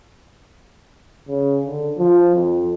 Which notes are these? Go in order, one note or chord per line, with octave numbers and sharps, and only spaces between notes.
C#3
D3
F3
F2